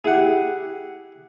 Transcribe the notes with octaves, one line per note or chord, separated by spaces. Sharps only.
E4 G4 G#4 F#5